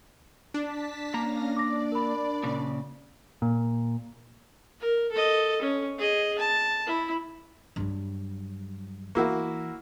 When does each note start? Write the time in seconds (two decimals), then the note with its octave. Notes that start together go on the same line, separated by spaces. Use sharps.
0.54 D4 A5 B6
1.14 A#3 C#4 F5 A#5 A#6
1.56 D5 D6 A#6
1.92 A#4 B5
2.43 A#2 C#3
3.42 A#2
4.81 A#4
5.12 A4 D#5
5.62 C#4
5.98 G#4 D#5
6.39 A5
6.87 E4
7.76 G2 F#3
9.15 E3 A#3 E4 F#4